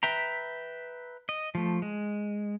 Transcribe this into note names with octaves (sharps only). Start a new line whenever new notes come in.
B4 E5 G5 A#5
D#5
F3 A3
G#3